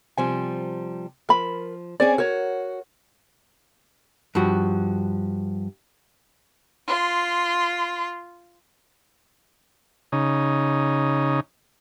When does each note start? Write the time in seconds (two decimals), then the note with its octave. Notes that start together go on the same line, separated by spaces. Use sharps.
0.17 C3 F3 G3 G#5
1.29 F3 A#4 B5
2.00 C4 C#4 G#4 D5
2.18 F#4 A#4 C#5
4.35 G2 F3 F#4
6.87 F4 C6
10.12 C#3 D#4